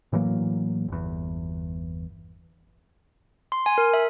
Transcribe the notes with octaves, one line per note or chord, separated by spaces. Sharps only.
A2 E3 F#3 A#3
G1 E2
C6
G#5
A#4
E5